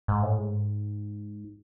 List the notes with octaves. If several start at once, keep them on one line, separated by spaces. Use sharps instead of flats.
G#2
A2
G#2